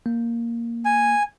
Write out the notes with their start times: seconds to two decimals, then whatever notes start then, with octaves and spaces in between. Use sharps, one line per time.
0.06 A#3
0.85 G#5